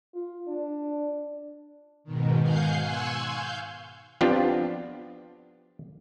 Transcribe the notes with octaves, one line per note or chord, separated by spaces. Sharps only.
F4
D4
G#2 B2 D#3
F5 F#5 G#5 G6 C7
G#5 C6 C#6 E6 F#6 G#6
F5 G6
F3 B3 C4 D4 F4 G4